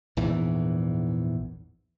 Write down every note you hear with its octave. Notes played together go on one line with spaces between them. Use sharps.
A#1 E2 G#2 E3